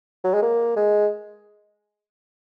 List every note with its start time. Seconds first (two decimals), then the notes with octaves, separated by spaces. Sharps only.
0.24 F#3
0.34 G#3
0.42 A#3
0.76 G#3